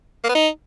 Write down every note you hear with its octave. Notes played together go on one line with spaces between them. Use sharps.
A#3
B3
D#4